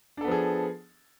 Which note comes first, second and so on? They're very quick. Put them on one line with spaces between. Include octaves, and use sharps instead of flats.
D4 A4 B3 F3 G#4